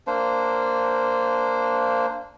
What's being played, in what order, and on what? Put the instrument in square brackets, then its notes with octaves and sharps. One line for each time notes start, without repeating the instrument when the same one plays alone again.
[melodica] A#3 D4 C5